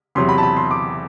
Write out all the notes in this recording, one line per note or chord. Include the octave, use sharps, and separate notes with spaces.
E2 C3 F#3 C6
B5
A5
B5
C6
D6